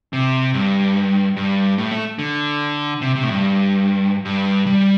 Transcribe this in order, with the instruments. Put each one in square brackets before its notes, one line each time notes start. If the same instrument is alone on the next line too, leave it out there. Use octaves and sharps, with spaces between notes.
[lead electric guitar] C3
G2
G2
A2
A3
D3
C3
C3
A2
G2
G2
G3